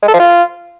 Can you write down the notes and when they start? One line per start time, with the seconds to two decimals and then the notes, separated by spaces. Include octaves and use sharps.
0.02 G#3
0.08 A4
0.14 F3
0.20 F4